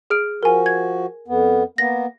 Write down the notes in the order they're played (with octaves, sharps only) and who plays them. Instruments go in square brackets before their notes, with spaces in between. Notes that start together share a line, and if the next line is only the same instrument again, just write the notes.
[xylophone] G#4 F6 D7
[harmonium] F3 F#4 [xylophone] A#4 G#5
[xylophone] G#6
[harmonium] F2 B3
[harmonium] A#3 B3 [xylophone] A#6